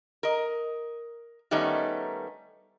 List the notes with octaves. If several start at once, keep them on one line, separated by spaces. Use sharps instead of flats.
A#4 D#5
D#3 G3 A3 B3 C#4 D#4